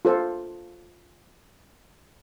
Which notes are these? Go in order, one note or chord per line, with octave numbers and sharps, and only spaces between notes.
F4 A4 C5